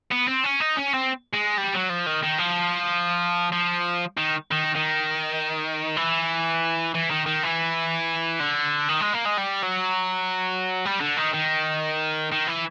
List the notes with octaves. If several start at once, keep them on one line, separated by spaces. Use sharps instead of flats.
B3
C4
C#4
D#4
C#4
C4
G#3
G3
F#3
F3
D#3
D#3
F3
F3
D#3
D#3
D#3
E3
E3
D#3
D#3
E3
D3
D#3
G#3
A#3
G#3
G3
F#3
G3
D3
D#3
D#3
D#3
E3